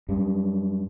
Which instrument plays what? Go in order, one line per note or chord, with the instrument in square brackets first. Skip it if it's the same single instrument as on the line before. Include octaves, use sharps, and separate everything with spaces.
[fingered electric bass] F#2 G3